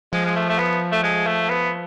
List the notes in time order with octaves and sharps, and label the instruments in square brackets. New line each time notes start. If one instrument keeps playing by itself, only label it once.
[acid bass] F3 [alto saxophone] G#3
[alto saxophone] G#3
A3
A3
B3
A3
G#3
A3
B3